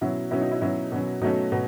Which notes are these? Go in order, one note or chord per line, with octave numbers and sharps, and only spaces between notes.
B2 F#3 C#4 E4
B2 F#3 C#4 E4
D#4
E4
B2 F#3 C#4 E4
B2 F#3 C#4
B2 F#3 A3 C#4 D#4
B2